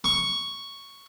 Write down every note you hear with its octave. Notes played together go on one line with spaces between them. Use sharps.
C#6